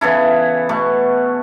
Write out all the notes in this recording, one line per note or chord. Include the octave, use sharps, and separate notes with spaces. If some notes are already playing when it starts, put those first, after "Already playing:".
C#3 E3 B3 E4 A4
B2 A3